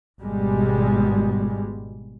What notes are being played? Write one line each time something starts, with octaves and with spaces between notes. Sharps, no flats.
G#1 B2 G3 G#3